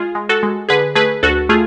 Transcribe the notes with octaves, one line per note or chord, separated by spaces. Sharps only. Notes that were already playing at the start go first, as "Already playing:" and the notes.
Already playing: G#3 F4 G#4
G#3
F#4 A4
G#3
D3 G#4 B4
A3 G#4 B4
D2 F#4 A4
A3 F4 G#4